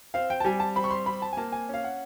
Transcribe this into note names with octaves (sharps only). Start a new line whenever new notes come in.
C4 F5
G5
A5
G3 G#5
A5
C4 B5
C#6
C6
C4 B5
A5
G#5
A#3 A5
G#5
C#4 F5
F#5